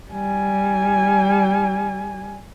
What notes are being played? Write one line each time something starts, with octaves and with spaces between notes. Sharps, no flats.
G3 G#5